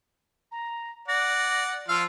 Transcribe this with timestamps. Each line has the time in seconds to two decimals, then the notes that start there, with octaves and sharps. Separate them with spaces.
0.51 A#5
1.08 D5 F#5 A#6
1.88 F3 F4 F5 E6